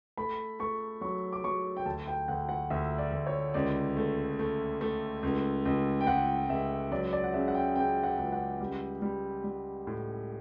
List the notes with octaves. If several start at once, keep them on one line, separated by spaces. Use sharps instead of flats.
A3 B5
A3 C#6
F#3 C#6
D6
F#3 C#6
G5
D2 A5
G5
D2 F#5
F#5
D2 E5
D5
D2
C#5
C#2 D5
A3
A3
A3
C#2
C#2
G5
C#2 F#5
C#2 E5
F#3 D5
D5
F#5
C#3 E5
F#5
G5
C#3 G5
F#5
C#2
F#5
G3
G3
G3
A2